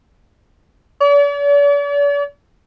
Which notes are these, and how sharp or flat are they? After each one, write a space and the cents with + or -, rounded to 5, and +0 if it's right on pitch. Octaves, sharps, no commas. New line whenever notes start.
D5 -45